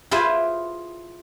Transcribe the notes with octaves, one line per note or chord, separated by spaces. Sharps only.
E4 F4 G#4 B4 C5